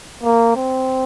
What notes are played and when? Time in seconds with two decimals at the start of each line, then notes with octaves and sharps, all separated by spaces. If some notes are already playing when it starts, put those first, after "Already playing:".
0.23 A#3
0.56 C4